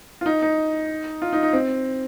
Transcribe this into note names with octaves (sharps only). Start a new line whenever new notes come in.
F4
D#4
D#4
F4
D#4
D#4
C4